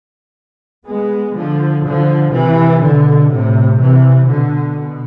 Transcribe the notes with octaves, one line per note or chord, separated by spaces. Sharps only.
G#3 B3
D3 F3
D3 F3
C3 E3
B2 D3
A2 C3
C3 E3
B2 D3
B2